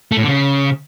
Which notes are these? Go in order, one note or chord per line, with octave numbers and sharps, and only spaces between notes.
A3
A2
D3
C#3